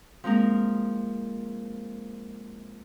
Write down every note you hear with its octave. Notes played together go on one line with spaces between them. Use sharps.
F3 G#3 A#3 C4 A#4